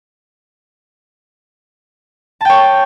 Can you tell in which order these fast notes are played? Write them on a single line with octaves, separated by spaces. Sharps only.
A5 G5 C#5